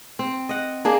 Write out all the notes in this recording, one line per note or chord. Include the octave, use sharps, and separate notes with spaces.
C4
D#5 F#5
A#3 D4 G#4